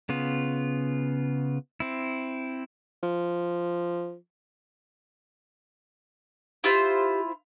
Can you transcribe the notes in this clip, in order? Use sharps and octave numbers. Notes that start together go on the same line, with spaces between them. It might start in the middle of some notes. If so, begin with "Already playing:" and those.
C#3 B3 F4
C4 E4
F3
E4 F4 G4 C5